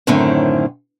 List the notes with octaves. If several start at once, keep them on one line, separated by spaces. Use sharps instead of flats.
F#2 A2 D3 D#3 C4 C#4